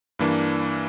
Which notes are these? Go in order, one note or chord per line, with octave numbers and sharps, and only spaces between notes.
G2 E3 A#3 D4